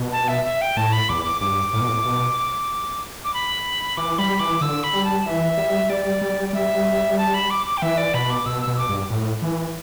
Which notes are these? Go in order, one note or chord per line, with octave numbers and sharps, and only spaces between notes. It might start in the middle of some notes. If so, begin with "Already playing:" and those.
Already playing: B2
A5
E5
E5
G5
A2 A5
B5
E2 D6
D6
G2 D6
A2
B2
A2
B2
D6
B5
E3 D6
G3 B5
E3 D6
D3 E6
B5
G3
A5
E3 E5
G3
G3 D5
G3
D5
G3 E5
A5
B5
D6
D6
G5
E3 E5
D5
B2 B5
D6
B2 E6
E6
B2
E6
D6
G2
A2
E3